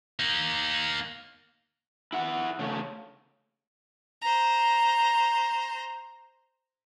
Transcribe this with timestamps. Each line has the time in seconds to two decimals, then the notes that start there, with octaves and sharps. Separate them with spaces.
0.19 A#3 D#4
2.13 E4 F#5
2.59 C#3 A3
4.21 C5 A#5